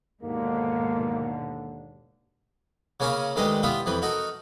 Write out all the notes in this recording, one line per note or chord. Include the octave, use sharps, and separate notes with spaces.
D#2 G#2 B2 D3 A#3
C#3 A#3 C#4 A#4 G#5 B5
D2 D#3 G#3 G4 B4 D#5
B3 E4 F4 G4 E5
F2 E3 B4
D#4 F#4 A4 A#4